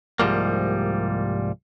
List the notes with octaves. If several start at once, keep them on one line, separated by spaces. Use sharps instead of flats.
C2 G#2 F3 G3 A#3